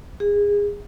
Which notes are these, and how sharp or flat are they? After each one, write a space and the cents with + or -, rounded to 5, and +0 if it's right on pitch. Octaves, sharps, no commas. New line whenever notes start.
G#4 -25